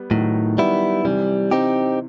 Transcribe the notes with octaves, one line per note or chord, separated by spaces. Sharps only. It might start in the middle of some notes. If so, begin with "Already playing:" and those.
Already playing: G3 B3
A2 D#3 F#3
G3 B3 E4
C3 E3 G3
C4 D#4 G4